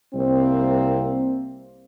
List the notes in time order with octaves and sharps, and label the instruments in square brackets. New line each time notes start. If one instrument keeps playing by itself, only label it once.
[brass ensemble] C2 A#3 C4